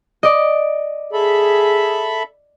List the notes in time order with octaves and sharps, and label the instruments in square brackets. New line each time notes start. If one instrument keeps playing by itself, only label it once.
[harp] D5 D#5
[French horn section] G#4 [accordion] A4 E5 B5